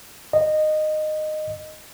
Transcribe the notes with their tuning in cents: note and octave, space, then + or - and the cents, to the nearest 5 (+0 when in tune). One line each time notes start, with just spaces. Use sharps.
D#5 -15